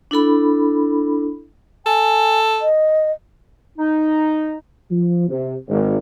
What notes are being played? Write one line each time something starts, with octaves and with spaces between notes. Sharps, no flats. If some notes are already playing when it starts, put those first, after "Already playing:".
D4 E4 A4 B5
A4 G#5
D#5
D#4
F3
C3
G#1